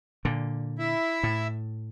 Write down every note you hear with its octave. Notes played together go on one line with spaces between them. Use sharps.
A#2 D3
E4 E5
A2